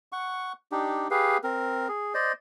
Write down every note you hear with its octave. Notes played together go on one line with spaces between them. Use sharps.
F#5 C#6
D4 D#4 G4
G4 G#4 B4 F5
C4 A#4
G#4
C5 D5 D#5